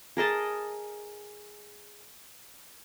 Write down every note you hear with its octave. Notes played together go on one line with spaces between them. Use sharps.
G#4 A#4 D#5 A5